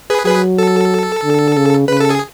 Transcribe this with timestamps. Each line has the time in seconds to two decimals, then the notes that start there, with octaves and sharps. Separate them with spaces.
0.10 G#4 B4
0.26 F#3 G#4 B4
0.58 A4
1.24 D3
1.56 C#3
1.88 C#3 B4
2.00 A4
2.10 G#4